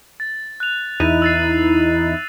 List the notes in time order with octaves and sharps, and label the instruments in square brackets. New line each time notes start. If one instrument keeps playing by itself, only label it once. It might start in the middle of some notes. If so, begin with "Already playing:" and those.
[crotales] A6
F#6 F7
[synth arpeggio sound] E2 D#4 E4 [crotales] D#7
[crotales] E6 A6 C7